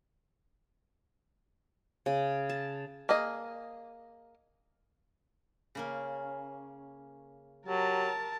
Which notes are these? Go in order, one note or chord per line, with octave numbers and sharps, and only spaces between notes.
C#3
A5
A#3 G#4 D#5
C#3 A#3 C#4
F#3 G4 A#4 A5